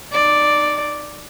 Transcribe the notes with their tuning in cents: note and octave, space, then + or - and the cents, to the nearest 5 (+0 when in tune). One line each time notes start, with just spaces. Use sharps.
D#4 -25 D5 +0